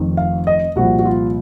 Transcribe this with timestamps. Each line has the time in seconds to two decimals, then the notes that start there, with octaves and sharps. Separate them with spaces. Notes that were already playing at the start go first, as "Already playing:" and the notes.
Already playing: F1 F2 D#3
0.17 F5
0.47 D#5
0.76 C2 A#2 F3 F#4
0.99 F#4
1.05 F4